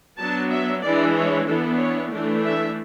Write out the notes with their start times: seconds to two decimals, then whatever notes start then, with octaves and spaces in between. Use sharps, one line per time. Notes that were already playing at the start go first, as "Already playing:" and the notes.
0.20 F#3 B3 D4 A5
0.51 E5
0.84 E3 G#3 D4 D5
1.16 C#5
1.47 E3 B3 D4 A4
1.79 C#5
2.11 E3 A3 D4
2.43 E5